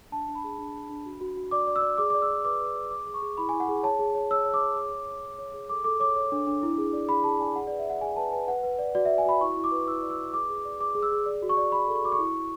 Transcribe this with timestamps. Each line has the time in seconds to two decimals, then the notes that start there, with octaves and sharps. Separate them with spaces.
0.12 D4 A5
0.29 D4
0.35 B5
0.44 G#4
0.59 D4
0.75 D4
0.90 D4
1.06 F#4
1.21 F#4
1.36 F#4
1.51 D5 D6
1.67 D5
1.76 E6
1.82 D5
1.98 G#4 D6
2.10 D5 D6
2.22 E6
2.29 D5
2.44 B4 D6
2.61 B4
2.76 D5
2.91 G#4 D6
3.07 G#4
3.14 C#6
3.22 G#4
3.37 E4 B5
3.49 E4 G#5
3.60 F#5
3.68 G#4
3.83 C#5 A5
3.99 G#4
4.15 C#5
4.30 C#5 E6
4.45 C#5
4.54 D6
4.62 C#5
4.76 G#4
4.93 G#4
5.08 C#5
5.23 C#5
5.38 C#5
5.53 G#4
5.70 A4 D6
5.84 A4 D6
6.00 C#5 D6
6.16 C#5
6.32 D4
6.47 D4
6.63 E4
6.78 G#4
6.93 D5
7.08 G#4 B5
7.24 G#4 A5
7.39 D5 G#5
7.55 G#4 F#5
7.67 B4 D5
7.79 E5
7.86 B4 F#5
8.01 G#4 G#5
8.16 B4 A5
8.32 B4 G#5
8.48 B4 F#5
8.63 B4
8.79 D5
8.95 F#4 D5
9.05 F#4 E5
9.18 G#5
9.26 F#4 B5
9.41 E4 C#6
9.57 E4
9.64 D6
9.72 B4
9.88 E4 E6
10.02 D5
10.10 E6
10.19 B4
10.33 G#4 D6
10.49 G#4
10.65 D5
10.80 G#4 D6
10.95 G#4
11.03 E6
11.11 G#4
11.26 D5
11.42 F#4
11.49 C#6
11.57 D5
11.72 D5 B5
11.88 A4
11.96 C#6
12.04 F#4 D6
12.12 C#6
12.19 E4
12.35 E4